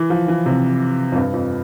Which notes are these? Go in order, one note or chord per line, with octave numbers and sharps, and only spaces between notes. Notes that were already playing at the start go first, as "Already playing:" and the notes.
Already playing: E3
F3
E3
C3
F2
G2
F2